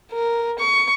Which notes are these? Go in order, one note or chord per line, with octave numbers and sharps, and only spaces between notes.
A#4
C#6